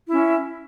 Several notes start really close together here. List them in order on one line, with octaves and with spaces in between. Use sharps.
E4 C#4 E5